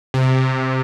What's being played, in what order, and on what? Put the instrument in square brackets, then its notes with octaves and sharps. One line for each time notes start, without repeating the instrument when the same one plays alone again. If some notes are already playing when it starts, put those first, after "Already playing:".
[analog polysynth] C3